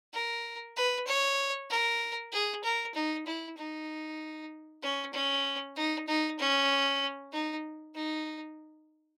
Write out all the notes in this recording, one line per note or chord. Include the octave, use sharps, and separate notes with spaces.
A#4
B4
C#5
A#4
G#4
A#4
D#4
E4
D#4
C#4
C#4
D#4
D#4
C#4
D#4
D#4